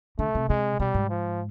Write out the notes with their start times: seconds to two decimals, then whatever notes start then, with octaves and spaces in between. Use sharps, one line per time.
0.19 D3 A3
0.35 C3
0.49 C3 G#3
0.79 B2 G3
0.94 G#2
1.09 F3